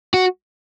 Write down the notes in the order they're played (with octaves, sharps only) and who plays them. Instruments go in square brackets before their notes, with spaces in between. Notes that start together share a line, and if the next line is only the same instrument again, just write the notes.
[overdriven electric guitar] F#4